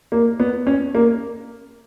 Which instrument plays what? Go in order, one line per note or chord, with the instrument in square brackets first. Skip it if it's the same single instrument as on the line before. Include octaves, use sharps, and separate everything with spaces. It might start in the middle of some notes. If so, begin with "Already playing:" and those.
[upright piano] A#3
B3
C#4
A#3